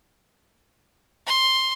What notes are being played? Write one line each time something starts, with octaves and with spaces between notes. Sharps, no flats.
C6